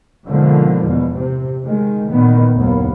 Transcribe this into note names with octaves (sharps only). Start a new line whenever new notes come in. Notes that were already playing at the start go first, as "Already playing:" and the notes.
B2 D3 D#3 F3 G#3 A#3
E2 B2
C3
D#3 G#3
A#2 D#3 B3
F#1 D#2 A#3 B3